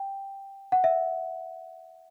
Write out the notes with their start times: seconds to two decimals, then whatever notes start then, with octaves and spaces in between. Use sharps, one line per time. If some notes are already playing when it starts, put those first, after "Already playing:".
Already playing: G5
0.72 F#5
0.84 E5